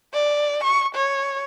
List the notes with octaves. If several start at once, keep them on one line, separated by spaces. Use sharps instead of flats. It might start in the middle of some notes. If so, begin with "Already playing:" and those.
D5
C#6
C#5